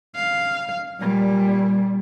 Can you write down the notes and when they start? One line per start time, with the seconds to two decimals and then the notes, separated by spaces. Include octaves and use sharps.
0.16 F5
1.00 A#2 G3